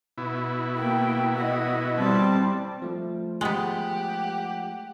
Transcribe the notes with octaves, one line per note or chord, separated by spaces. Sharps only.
B2 E4
A#3 G5
D#5 F#5
G3 C4 A5
F3 A3
G#3 B3 G4 F#5